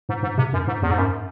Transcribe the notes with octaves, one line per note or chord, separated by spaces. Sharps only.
G#2
G#2
C3
F#2
G#2
E2
G#2
F#2